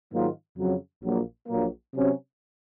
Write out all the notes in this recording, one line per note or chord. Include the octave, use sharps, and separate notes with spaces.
G#2 D#3 F#3 A#3 F4
F2 C#3 F#3
A#1 A#2 F#3 A#3
A#1 A#2 F#3 A#3
C3 F#3 C#4